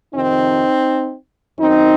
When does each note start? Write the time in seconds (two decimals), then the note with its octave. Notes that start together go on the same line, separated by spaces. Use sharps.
0.14 F2 C3 D#3 C4 D#4
1.58 F#2 D#3 C4 D#4